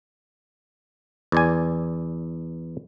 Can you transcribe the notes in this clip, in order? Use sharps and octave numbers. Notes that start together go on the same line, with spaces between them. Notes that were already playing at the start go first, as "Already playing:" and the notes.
E2 D5 G#5